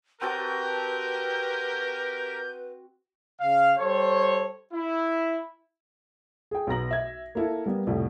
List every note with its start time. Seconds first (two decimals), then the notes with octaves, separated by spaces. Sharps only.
0.22 C4 F#4 G4 A#4 B4 A5 G6
3.41 C#3 F5
3.78 G3 A4 C5 C#5
4.74 E4
6.51 G#4 G5
6.67 B1 B3 A#5 A#6 F#7
6.91 E5 G#6
7.35 A#3 E4 A4
7.66 G3 A#3 B3
7.87 C2 F2 A2